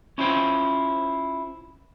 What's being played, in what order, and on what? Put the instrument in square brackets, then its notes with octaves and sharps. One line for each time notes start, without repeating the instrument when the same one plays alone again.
[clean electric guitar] C#4 E4 F4 C5 G5